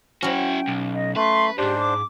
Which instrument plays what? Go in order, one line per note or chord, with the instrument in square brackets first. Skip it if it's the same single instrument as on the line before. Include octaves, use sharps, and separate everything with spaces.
[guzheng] F#3 C#4 [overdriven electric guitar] E4 F#4 [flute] G5
[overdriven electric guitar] B1
[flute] D#5
[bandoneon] A3 [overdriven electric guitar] B4 [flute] C6
[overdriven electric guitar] E2 G#2 [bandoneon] D4 C5 [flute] G4
[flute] D6